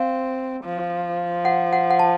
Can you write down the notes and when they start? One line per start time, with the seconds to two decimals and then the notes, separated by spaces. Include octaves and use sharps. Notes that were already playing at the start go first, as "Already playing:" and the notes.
Already playing: C4 F5
0.64 F3
1.45 F#5
1.73 F#5
1.90 F#5
1.99 A5